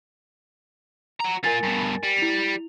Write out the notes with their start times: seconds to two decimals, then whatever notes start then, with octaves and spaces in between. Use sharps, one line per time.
1.20 F#4 A#5
1.44 A#3 F4 A#4 G#5 A6
1.64 G2 B2
2.03 G3
2.18 E4 F7